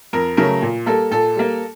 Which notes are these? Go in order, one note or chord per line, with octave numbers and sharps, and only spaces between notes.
F2 A#4
C#3 F#3 A3 A#4
A#2
G3 A#3 A4
A#2 A4
G3 A#3